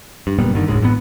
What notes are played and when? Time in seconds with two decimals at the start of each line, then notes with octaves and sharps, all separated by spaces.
0.27 G2
0.38 F#1 A#2 G3 B3
0.54 G2 D3 D#3
0.68 G1 D2 A2 G#3
0.81 A1 A2 C3 B3